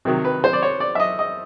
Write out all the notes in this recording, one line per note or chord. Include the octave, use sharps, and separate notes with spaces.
C3 D#3 F#3
B4
C5
D5
C#5
D5
E5
D#5
D#5